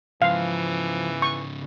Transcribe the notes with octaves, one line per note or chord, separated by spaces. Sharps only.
G#2 C#3 E3 F3 F5
C#6